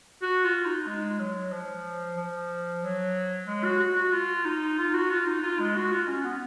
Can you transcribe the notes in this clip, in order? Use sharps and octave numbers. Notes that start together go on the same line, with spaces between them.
F#4
F4
D#4
G#3
F#3
F3
F3
F#3
G#3
F#4
F#4
F#4
F4
D#4
F4
F#4
F4
D#4
F4
G#3
F#4
F4
C#4
B3